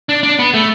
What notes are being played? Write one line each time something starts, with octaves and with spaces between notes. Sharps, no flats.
D4
D4
B3
A3